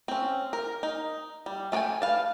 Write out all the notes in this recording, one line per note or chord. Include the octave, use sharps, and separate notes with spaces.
C4 C#4
A#4
D#4
G3
A3 A4 B4 G5 G#5
B4 F5 A5